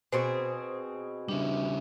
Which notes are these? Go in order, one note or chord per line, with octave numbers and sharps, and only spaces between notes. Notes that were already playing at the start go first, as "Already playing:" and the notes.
B2 C4 G#4 C5
C#3 G3 D4 E5